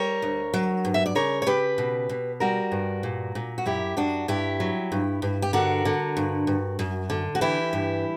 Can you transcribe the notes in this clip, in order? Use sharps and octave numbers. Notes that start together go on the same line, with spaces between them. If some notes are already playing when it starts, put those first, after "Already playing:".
Already playing: G3 A#4 C#5
D2
F#3
G2
E5
D5
C#3 A#4 C#5
C#5
C#3 G4 B4
B2
B2
G3 F#4 A#4
G2
A#2
A#2
F#4
F#2 E4 G4
F#2 D4 F#4
G2 E4 G4
F#3
G2
G2
G4
D3 F#4 A#4
D3
G2
G2
F#2
D3
F#4
E3 E4 G4
G2